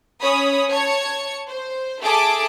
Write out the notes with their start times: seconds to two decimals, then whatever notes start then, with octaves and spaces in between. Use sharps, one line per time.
0.22 C#4 C#5 B5 D#6
0.70 C#5 A5 G#6 C#7
1.48 C5
2.02 G#4 A4 E5 A5 D6